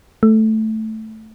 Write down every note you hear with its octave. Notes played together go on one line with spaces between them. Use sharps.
A3